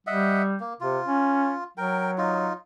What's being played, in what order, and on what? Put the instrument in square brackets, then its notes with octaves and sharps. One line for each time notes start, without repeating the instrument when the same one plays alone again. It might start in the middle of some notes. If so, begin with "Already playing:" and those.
[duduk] G3 [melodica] D#5 E5 F#5
[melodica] A#3
[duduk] C3 [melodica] F4
[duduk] C#4
[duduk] F#3 [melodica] A#4 G5
[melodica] D#4 F4